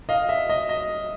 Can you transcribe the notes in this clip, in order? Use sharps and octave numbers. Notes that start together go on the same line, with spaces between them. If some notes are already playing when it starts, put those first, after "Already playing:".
D#5 F5
E5
D#5
D#5